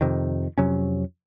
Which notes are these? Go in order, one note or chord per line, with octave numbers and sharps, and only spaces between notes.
F2 C3 D#3
F2 C3 F#3 C#4